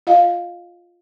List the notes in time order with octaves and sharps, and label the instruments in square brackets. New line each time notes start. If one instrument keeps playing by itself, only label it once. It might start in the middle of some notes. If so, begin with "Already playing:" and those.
[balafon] F4 D#5 F5